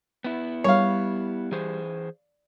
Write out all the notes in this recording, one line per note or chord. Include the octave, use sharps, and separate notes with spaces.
B3 E4
G3 C#5 F5
E3 G#4 C5